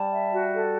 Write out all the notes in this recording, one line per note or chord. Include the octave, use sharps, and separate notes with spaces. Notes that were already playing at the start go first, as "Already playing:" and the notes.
Already playing: G3 A5
E5
F#4
A4